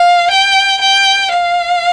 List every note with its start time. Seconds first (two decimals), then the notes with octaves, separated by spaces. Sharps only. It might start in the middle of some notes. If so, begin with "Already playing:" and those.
Already playing: F5
0.31 G5
0.81 G5
1.33 F5